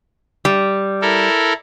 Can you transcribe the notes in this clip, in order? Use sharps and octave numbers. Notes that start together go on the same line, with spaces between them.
G3
E4 A4 A#4